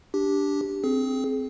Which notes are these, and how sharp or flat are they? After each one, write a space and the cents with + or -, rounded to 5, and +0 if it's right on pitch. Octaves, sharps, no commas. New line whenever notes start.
D4 -10 G4 +0
C4 +0 G#4 +30